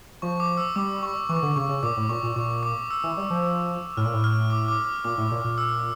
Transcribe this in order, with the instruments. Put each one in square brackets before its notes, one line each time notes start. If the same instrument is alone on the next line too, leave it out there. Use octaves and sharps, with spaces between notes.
[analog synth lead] F3 [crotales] C#6
[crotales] D6
E6
[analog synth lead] G3 [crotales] D6
[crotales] C#6
[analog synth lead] E3 [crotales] C#6
[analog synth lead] D3
[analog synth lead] C#3 [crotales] C#6
[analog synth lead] C#3
[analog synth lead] A#2 [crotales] D6
[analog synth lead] A2
[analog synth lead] A#2 [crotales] C#6
[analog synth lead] A#2
[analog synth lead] A#2 [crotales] C#6
[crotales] D6
E6
[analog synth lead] E3
G3
F3
[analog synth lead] A2 [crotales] F6
[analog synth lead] A#2
A2
[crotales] F6
D6
D6
[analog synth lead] A#2 [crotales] D6
[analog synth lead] A2
A#2
A#2
[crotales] E6